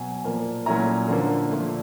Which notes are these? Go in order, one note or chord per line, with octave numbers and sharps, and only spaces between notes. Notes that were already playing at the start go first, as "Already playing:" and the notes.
Already playing: B2 F#3 G#5
A#2 F3 A#3
A#2 F#3 A3 C#4 E4 A#5
D3 F3 A#3
A#2 F3 A3